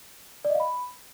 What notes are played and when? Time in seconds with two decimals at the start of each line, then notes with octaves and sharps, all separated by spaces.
0.45 D5
0.50 D#5
0.55 F5
0.60 B5